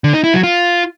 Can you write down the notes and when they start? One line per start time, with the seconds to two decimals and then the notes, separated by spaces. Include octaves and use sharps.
0.04 D3
0.14 D#4
0.24 E4
0.34 F#3
0.43 F4